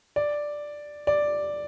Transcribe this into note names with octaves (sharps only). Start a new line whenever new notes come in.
D5
D5